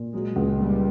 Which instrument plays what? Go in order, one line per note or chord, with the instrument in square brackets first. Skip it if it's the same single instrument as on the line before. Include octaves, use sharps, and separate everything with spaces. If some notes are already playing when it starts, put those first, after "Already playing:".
Already playing: [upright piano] A#2
[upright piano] F#3 [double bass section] G#3
[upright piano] C#2
[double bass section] G3 [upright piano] A#3